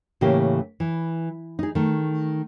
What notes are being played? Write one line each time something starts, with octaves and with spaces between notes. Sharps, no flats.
A2 C#3 E3 A#3 G4
E3
D#4 G#4
D#3 A3